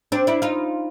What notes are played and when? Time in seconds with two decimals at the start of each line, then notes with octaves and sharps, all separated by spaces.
0.12 C4 D4
0.27 D4 E4
0.42 D#4 F4